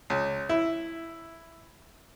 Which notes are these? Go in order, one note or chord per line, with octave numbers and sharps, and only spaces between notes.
C#2
E4